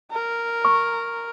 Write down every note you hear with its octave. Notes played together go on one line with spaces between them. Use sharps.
A#4
C#6